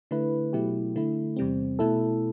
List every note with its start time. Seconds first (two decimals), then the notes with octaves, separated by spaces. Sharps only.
0.11 D3 A3 E4 B4
0.53 B2 F#3 A3 E4 G4
0.96 D3 A3 E4
1.36 E2 C3 G3 C4
1.79 B2 A3 E4 A4